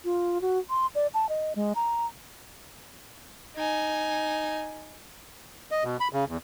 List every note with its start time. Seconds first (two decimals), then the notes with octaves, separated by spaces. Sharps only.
0.05 F4
0.41 F#4
0.70 C6
0.95 D5
1.14 A5
1.29 D#5
1.56 G#3
1.75 A#5
3.56 D#4 G#5
5.71 D#5
5.84 B2
6.00 B5
6.13 C#3
6.28 E2